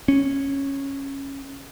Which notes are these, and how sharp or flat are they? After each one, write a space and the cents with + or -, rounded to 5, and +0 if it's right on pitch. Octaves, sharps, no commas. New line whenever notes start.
C#4 -10